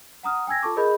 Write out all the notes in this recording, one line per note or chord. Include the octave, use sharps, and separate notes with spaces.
F#5 A#5 D#6 F6
G5 G#5 E6 G#6 A#6
F4 A4 A5 C#6 D6
G#4 A#4 C5 D#5 B5 G6